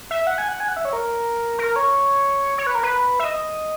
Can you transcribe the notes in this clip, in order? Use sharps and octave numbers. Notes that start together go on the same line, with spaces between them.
E5
F#5
G#5
F#5
G#5
F#5
E5
C#5
A#4
A#4
C#5
C#5
B4
A#4
B4
E5
D#5